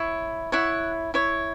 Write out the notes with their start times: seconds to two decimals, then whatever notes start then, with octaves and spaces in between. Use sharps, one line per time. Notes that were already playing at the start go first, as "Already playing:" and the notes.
Already playing: E4 C#5
0.52 E4 C#5 F#5
1.14 E4 C#5